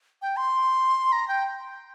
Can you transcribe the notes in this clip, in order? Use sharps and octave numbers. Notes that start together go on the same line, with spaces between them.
G5
C6
A#5
G5